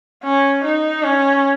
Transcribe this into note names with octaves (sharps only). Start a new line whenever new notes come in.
C#4
D#4
C#4